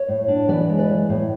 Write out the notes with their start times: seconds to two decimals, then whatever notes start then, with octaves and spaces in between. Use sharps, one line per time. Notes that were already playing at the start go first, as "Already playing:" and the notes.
Already playing: C#5
0.08 A2
0.28 D4
0.48 E3 B4 D5
0.69 G#3
0.79 B4 D5
0.89 E3
1.09 A2